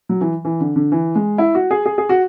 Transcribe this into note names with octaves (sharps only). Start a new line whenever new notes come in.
F#3
E3
E3
D3
D3
E3
G#3
E4
F#4
G#4
G#4
G#4
F#4